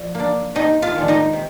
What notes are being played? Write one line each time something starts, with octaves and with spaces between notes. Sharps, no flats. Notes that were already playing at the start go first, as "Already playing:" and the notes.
Already playing: F3 D5
A#3 D4
C3 D#4 D#5
F4 F5
D#3 G#3 D4
D#4 D#5
C3